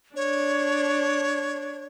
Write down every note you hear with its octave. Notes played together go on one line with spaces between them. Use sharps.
D4 C#5